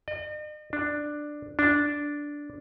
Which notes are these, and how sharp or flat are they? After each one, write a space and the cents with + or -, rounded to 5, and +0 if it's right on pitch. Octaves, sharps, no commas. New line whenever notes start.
D#5 -45
D4 +10
D4 -5